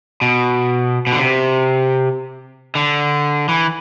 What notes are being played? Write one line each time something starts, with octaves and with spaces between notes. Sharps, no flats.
B2
B2
D3
C3
D3
E3